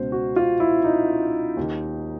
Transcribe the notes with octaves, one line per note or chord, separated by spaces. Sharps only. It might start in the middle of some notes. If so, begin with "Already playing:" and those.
Already playing: C#2 B2 C5
F#4
F4
E4
D#4
D#2 D#3